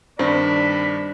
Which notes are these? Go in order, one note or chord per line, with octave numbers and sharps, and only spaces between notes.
G2 D#3 C4 D4 B5